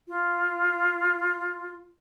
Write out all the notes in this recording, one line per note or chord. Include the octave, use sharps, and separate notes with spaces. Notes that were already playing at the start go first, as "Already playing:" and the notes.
F4